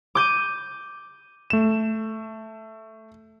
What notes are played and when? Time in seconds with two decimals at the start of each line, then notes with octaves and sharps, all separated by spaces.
0.15 D6 G6 D#7
1.50 A3 E7